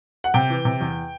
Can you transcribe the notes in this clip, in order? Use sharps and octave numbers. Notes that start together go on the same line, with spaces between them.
F#5
C3 G5
E3
C3
E2